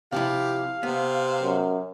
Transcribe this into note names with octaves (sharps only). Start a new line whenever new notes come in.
C3 F3 E4 G4 F5
C3 B3
F#2